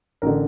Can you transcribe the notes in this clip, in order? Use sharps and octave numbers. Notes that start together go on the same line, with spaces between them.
A1 D3 A#4